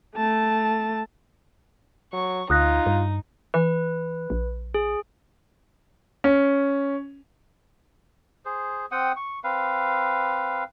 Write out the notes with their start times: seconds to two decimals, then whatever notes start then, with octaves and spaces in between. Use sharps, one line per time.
0.16 A3 A5
2.13 F#3 C#6
2.50 D2 D#4 F4 D#6 F#6 A#6
2.86 G2
3.54 E3 B4
4.30 A#1
4.74 G#4
6.24 C#4
8.45 G#4 C5
8.91 C4 F#5 G5 D#6
9.17 C#6
9.44 C4 B4 F5